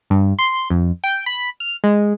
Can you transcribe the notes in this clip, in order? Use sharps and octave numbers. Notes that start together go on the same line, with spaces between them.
G2
C6
F2
G5
B5
F6
G#3